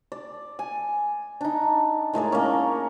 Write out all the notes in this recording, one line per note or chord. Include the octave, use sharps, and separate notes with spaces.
D5
G#5
D4 D#4
A2 G#3 A#4 D5
A#3 C#4